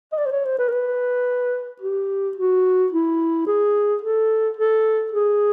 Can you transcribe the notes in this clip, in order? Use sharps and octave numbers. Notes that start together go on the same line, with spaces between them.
D#5
D5
C5
C#5
C5
B4
A#4
B4
G4
F#4
E4
G#4
A4
A4
G#4